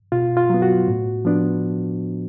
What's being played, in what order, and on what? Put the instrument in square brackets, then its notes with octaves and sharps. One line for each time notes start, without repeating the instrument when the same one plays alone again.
[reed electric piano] B2 F4
F4
F#3 B3
F#4
A2
F3 B3 D4